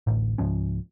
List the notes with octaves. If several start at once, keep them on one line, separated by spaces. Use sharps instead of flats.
A1 D2 A2
C#2 G#2 F3 C#4